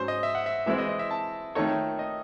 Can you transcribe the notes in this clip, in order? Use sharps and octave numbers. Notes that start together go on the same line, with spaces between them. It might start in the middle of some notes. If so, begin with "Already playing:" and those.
Already playing: G#2 F#3 C#4 C5
D#5
E5
F#5
E5
E3 G#3 C4 E4 E5
D#5
D#5
E5
A5
D#3 A3 D#4 A4 C#5
D#5